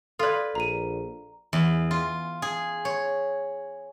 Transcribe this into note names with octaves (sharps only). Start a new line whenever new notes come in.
F4 A4 B4 D5
A#1 A#5 D#7
E2
F4
G#4
C#5